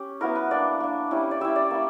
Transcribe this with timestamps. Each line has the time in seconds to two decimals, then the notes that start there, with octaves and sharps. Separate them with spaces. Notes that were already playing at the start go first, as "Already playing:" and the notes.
Already playing: C#4 G4
0.21 F#3 B3 E4 A#4
0.36 B4
0.51 A#3 D4 D5
0.80 A#3 D4
1.11 G3 C#4 E4
1.31 D5
1.40 G3 C#4 E4 E5
1.56 D5
1.71 A#3 E4